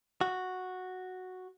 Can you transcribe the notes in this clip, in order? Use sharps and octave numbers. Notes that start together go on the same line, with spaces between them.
F#4